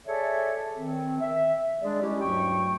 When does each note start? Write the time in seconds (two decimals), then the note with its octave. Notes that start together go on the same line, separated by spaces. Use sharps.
0.06 G#4 A4 C#5 D5 E5
0.76 D#3 C4
1.20 E5
1.81 G3 G#3 D4 G#4 D5
2.01 G#3 C#4 E4 G4
2.21 D2 G2 F#3 G5 C#6